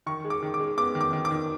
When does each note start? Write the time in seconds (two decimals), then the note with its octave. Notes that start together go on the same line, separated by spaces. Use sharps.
0.06 D#3 C#6
0.25 G#3
0.30 D6
0.43 D#3
0.54 D6
0.60 G#3
0.78 B3 D6
0.95 D#3
1.01 D6
1.13 D#3
1.25 D6
1.31 D#3